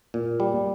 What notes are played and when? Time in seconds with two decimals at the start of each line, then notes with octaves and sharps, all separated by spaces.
0.14 A#2
0.40 G3